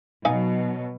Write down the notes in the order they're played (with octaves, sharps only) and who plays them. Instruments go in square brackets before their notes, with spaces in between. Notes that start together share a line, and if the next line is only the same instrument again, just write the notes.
[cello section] B2 F#3 [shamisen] D#4 F5 G#5